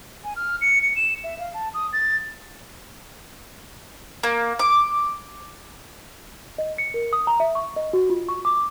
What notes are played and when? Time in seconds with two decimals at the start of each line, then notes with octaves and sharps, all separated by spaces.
0.24 G#5
0.36 F6
0.61 C#7
0.83 C#7
0.96 E7
1.24 E5
1.39 F5
1.54 A5
1.74 D#6
1.93 A6
4.23 A#3
4.59 D6
6.58 D#5
6.78 C#7
6.94 A#4
7.13 D#6
7.27 A#5
7.40 E5
7.55 C#6
7.76 D#5
7.93 F#4
8.10 F4
8.29 C#6
8.45 D6